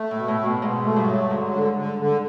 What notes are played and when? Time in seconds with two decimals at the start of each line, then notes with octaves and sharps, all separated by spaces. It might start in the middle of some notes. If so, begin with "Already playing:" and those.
Already playing: A3
0.11 A2
0.16 B2
0.28 A2
0.39 B2
0.45 A2
0.62 G#2 B2
0.84 A3
0.96 G2
1.07 F#3
1.30 G#2 D3
1.54 D3
1.76 D3
1.98 D3